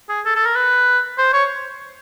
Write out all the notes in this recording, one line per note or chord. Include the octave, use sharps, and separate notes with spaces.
G#4
A4
A4
A#4
B4
C5
C#5